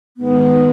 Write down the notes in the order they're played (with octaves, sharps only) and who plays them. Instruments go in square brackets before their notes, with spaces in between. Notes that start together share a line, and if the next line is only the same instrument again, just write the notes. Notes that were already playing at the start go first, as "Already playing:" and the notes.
[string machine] G#2 D#3 G#3 [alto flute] B3